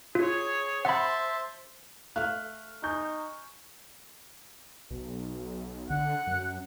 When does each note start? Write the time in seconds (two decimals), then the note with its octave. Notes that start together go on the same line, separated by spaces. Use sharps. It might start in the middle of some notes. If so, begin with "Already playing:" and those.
0.15 F4 G#4 C#5
0.85 C5 E5 F#5 A5 B5 C6
2.16 A3 E5 F5 F6 F#6
2.83 D#4 G#5 C#6 G6
4.91 B1
5.90 D3 F#5
6.27 F#2